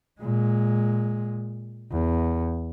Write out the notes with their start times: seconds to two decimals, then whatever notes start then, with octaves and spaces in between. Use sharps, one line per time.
0.21 A#2 G#3
1.91 E2